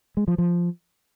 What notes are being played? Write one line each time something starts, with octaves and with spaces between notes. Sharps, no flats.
G#3
F3
F3